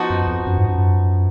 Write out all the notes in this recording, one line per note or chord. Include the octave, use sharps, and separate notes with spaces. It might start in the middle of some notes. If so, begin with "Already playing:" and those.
Already playing: F3 B3 D#4 F#4
F#2
F2
F#2
G#2
F#2